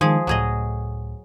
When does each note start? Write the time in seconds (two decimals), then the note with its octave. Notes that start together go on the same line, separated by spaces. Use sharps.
0.01 D#3 F3 G#3 G#4
0.27 C#2 A2 F#3 G#4 D#5